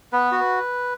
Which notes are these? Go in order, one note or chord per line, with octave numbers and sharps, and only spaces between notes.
B3 B4
F#4